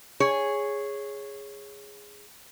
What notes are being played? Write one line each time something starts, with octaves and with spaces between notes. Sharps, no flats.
G#4 C#5